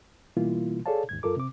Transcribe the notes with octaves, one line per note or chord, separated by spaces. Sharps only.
B2 E3 G3 A#3 E4 F4
G#4 A4 C#5 D5 F5 A5
D#2 G#2 G#6
F#2 F4 A4 A#4 D6
C3 C4 D6